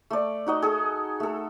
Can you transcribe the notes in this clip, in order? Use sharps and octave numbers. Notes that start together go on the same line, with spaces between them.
A3 D5
D#4 F#4 D#5
G#4 A4
A3 A4